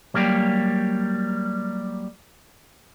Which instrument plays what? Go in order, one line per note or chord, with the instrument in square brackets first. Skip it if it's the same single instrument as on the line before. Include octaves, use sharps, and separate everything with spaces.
[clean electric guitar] F#3 G3 A#3 G4